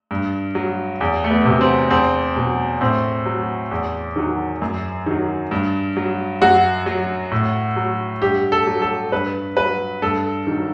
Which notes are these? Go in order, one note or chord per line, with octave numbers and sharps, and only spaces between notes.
G2
F#3
E2
A3
B3
C3
F#3
C4
E2 C4
B2 F#3
A2 C4
F#3
E2
D#3 F#3
F#2
D#3 F#3
G2
F#3
F#2 F#4
F#3
A2
F#3
G2 G4
A4
F#3
A4
G2 B4
F#3 B4
G2 A4
D#3 F#3